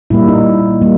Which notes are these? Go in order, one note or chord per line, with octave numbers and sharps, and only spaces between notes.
A#2 G3 A#3 E4
D#4
G3 A#3